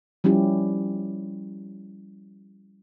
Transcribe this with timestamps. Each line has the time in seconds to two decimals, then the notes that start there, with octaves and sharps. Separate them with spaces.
0.24 F3 G3 C#4 E4 G4